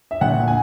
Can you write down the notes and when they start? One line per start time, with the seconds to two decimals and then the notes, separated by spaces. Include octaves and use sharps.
0.11 E5
0.21 A#1 F#5
0.39 A#2
0.48 G#5